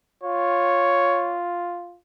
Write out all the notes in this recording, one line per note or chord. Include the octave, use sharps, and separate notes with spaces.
F4 C#5